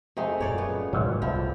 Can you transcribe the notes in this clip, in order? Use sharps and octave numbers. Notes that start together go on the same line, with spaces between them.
F2 C3 G#3 A3 D#4
F#2 A#2 C#5 D5 F5
C#3 B3
G#2 B2 D#3 F#3 G3 F4
C2 A2 F3 E4